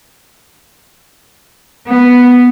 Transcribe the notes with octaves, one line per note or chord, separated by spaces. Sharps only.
B3